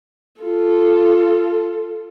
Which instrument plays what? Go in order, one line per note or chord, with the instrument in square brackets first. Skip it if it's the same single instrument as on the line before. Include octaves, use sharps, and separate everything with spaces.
[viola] F4 A4